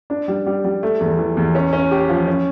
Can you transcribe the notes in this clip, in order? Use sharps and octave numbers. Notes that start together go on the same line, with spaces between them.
D4
G3
G3
G3
A3
E2
E3
E2
C#4
C#4
G4
F3
C#4